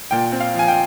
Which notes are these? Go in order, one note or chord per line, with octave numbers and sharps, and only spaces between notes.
A#2 G5
C4
F5
F3
G#5
G5